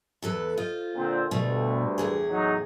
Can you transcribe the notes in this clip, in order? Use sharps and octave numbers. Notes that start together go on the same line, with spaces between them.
E2 A4 B4
F4 C5 D#5
A#2 D3 C4
D2 G2 B2 A3
E2 A2 G#4
F#3 D#4